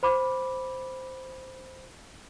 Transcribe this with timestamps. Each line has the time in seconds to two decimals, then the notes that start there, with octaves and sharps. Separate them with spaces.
0.03 C5 B5 D6